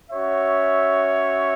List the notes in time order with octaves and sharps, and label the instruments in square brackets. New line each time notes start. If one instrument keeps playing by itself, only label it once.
[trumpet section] C#4 F#4 C#5 E5